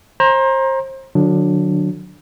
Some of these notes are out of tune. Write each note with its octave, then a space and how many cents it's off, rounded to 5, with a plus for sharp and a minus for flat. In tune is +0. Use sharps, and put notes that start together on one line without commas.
C5 +30 A#5 +20
D3 +25 F#3 -25 D4 +0